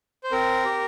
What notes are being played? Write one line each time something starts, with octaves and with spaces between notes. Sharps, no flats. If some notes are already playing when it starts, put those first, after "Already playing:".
C5
C4 A#4
G4